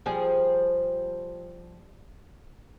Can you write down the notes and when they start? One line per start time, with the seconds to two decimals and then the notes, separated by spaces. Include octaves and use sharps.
0.06 F3 G3 G#4